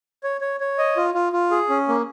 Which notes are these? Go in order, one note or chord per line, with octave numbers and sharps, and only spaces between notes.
C#5
C#5
C#5
D#5
F4
F4
F4
G#4
C#4
A#3